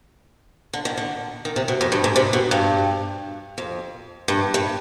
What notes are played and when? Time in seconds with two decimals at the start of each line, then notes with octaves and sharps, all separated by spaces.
0.73 D3
0.85 D#3
0.97 D3
1.45 D#3
1.56 C3
1.68 B2
1.81 F2
1.92 G2
2.04 G#2
2.16 C3
2.33 B2
2.51 G2
3.58 F2
4.28 G2
4.54 G2